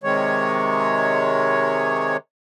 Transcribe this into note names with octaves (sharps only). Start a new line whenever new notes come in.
C3 D#3 G#3 C#5